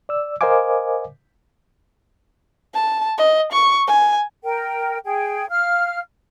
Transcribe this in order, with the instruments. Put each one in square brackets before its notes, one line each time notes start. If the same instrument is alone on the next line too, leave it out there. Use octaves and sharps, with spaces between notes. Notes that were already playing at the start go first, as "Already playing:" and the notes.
[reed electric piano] D5 E6
A#4 C5 D#5 F5 G#5 D6
[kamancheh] A5
D#5
C#6
G#5
[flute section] A#4 G5
G#4 G5
F5 F6